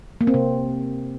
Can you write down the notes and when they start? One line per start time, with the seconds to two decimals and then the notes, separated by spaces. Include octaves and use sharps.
0.21 A#3
0.27 C4
0.34 C3